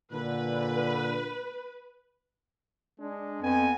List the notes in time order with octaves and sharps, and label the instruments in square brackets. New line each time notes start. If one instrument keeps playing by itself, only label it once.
[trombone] A#2 [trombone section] D3 [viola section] B4
[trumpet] G#3 [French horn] D4
[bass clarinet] F2 [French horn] B3 [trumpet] G#5